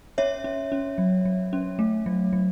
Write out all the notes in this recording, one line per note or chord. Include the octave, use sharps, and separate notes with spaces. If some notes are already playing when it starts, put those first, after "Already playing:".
C#4 C#5 E5
C#4
C#4
F#3
F#3
C#4
A3
F#3
F#3